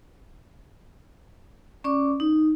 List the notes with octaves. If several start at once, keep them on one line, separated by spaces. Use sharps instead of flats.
C#4 D5 C#6 D6
D#4